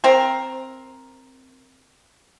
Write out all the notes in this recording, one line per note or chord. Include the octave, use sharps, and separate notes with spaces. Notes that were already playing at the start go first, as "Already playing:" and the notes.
C4 A#4